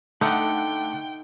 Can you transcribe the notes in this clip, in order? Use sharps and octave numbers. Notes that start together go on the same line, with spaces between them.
D3 A3 D#4 F#5 G5